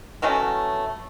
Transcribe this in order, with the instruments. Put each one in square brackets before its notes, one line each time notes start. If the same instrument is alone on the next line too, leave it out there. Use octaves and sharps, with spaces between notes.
[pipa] E3 F#3 A3 C#4